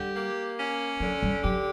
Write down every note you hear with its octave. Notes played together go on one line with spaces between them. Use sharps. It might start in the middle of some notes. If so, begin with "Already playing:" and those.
Already playing: D3 G3 G4
A#3
C#4
D3 F#3
G3
F#3 G4